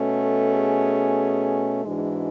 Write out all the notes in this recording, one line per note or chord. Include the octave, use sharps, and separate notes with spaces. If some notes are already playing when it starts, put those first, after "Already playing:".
Already playing: B2 A3 C#4
A4
G#4
G#2 E3 G#3 D4 F#4